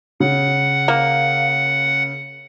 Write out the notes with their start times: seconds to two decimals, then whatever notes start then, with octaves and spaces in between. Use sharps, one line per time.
0.20 C#3 F#5
0.88 A#3